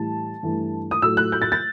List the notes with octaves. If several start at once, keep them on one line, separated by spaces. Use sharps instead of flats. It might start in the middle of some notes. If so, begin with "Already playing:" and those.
Already playing: A2 E3 G3 A5
G2 E3 A3
D#6
A2 F#3 A3 E6
F#6
G6
A6
A6